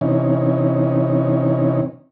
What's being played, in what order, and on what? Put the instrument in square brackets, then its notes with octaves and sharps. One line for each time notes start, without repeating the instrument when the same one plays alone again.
[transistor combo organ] C3 E3 C#4 D#4